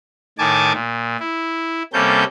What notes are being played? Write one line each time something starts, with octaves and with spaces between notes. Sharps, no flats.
A2 D#3 G#5 A5 D6
A#2
E4
C3 G3 A#3 C#4 A4 G6